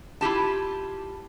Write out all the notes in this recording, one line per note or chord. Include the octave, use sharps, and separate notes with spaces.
E4 F4 G4 A5